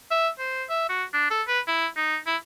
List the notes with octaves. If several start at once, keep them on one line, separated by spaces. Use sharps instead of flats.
E5
C5
E5
F#4
D4
A4
B4
E4
D#4
E4